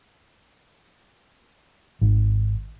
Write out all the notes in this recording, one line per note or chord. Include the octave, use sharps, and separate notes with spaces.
G#1